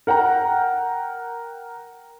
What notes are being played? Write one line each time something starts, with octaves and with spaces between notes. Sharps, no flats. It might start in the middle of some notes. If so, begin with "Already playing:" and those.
A#4 F#5 G5 A#5